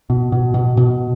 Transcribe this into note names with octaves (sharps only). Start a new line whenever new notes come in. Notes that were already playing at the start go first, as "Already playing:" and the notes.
B2
B2
B2
B2